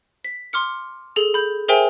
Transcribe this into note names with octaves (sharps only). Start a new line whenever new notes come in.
B6
C6 D6 F6 C#7
G#4 A4 F7
B5 G6
G#4 A#4 C5 E5 G5 G#5